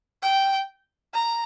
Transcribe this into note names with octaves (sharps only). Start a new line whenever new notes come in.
G5
A#5